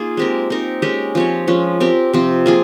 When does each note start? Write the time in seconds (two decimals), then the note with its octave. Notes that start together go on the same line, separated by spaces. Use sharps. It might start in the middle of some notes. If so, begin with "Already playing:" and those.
Already playing: A#3 D#4 F4 G#4
0.17 G#3 C4 G4 A#4
0.50 C4 D#4 A#4
0.82 G#3 C#4 G4 A#4
1.15 F3 C4 G4 C#5
1.47 F3 G#3 C#4
1.80 C4 G4 A#4
2.13 C3 F3 C4
2.46 A#3 F4 G#4